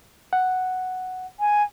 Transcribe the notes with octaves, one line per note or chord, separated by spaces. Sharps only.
F#5
G#5